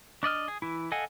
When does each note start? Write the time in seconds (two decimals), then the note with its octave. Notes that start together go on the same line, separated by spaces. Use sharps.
0.23 D4 D5 D#5 F6
0.48 G#4
0.62 E3 E4
0.92 A4 D#5 F5 F#5 G#5